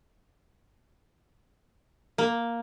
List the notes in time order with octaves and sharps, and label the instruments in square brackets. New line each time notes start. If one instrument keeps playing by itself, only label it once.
[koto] A#3